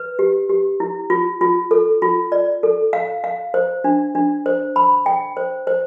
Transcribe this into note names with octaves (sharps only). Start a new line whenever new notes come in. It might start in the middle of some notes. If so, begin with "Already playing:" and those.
Already playing: B4
G4
G4
E4
F4
F4
A4
F4
D5
A4
F5
F5
C5
D4
D4
C5
B5
G5
C5
C5